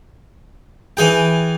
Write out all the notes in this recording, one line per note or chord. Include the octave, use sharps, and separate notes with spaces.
E3 G#4 G5